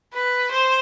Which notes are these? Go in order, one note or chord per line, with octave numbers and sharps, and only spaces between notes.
B4
C5